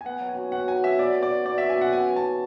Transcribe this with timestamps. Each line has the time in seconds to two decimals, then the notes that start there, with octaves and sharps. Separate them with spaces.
0.01 G#5
0.05 B3 F#5
0.20 F#3
0.29 G#5
0.37 F#4
0.52 F#4 F#5
0.68 F#3 G#5
0.83 B3 E5
0.98 B3 D5
1.14 B3
1.23 D5
1.31 F#4
1.46 B3 D5
1.58 F#4 E5
1.69 G#5
1.78 B3 F#5
1.92 F#2 G#5
2.09 E3
2.16 A5